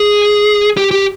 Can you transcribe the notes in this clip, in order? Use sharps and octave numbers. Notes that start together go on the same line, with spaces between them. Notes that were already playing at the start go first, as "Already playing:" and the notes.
Already playing: G#4
G4
G4